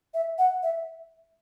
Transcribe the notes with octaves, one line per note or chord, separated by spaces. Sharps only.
E5
F#5
E5